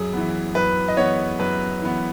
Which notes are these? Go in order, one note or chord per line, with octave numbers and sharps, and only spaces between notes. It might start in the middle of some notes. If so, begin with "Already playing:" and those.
Already playing: F#2 G#4
E3 B3
F#2 B4
D#5
E3 B3 C#5
F#2 B4
E3 B3